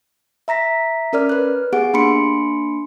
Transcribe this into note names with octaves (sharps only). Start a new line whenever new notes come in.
E5 A#5 A#6 B6
C#4 A#4 D5 F6
B4 F#6
B3 G4 G#4 F#5 D7
A#3 D4 B5 C6 C#7 D7